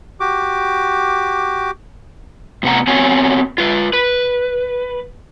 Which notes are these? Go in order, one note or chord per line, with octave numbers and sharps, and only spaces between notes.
F#4 G4 D6
A2 C3 B3 F#5 A#5
B3 C4 F#4 C#5 G#5
F4 B4
B4